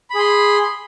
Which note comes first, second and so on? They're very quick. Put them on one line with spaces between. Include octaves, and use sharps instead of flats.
B5 G#4 C6